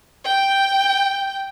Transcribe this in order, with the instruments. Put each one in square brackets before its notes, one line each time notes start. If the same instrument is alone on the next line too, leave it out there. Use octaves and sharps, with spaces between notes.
[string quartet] G5 G6